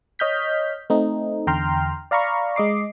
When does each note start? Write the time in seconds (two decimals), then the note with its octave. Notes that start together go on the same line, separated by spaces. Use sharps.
0.19 C#5 D#5 F6 G6 B6
0.90 A3 C4 D#4
1.47 E2 D3 G5 A#5 C6 F6
2.11 D5 F5 A#5 B5 C#6
2.56 G#3 D#5 D6 C7